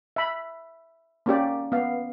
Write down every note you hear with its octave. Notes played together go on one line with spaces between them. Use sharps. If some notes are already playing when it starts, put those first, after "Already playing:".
E5 B5
A#3 C#4 G4 D5
B3 F5